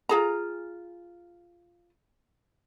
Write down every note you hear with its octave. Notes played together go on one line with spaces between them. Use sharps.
F4 G#4 A#5